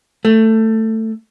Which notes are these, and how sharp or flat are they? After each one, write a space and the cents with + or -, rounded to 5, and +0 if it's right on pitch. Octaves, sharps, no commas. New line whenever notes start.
A3 +15